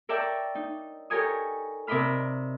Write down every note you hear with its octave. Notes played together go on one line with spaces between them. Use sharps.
A#4 C#5 D5 E5 G5 A5
D#4
G4 A4 A#4 C#5 G#5 D#6
C3 A#4 D5 D#5 B5 F6